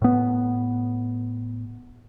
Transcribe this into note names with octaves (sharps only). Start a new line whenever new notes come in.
A2 B3